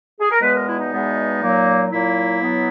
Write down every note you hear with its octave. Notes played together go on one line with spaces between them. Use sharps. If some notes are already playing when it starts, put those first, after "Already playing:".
G#4
A#4
E2 B2 G#3 B3 B4
A#4
E4
D#4
E2 B2 G#3 B3
A#2 F#3 A#3
A#2 F#3 A#3 E4
B2 F#3 B3